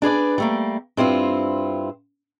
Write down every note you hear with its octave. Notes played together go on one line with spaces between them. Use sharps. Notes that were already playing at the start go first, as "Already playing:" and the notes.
D4 G#4 B4 D5
G3 A3 A#3
G2 C4 E4 F4